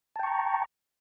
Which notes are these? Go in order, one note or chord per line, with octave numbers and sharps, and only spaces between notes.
G5 A5 A#5 C#6